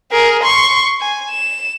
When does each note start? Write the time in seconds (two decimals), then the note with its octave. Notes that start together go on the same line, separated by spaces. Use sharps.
0.11 G#4 A#4
0.43 C6 C#6
1.01 G#5
1.30 E7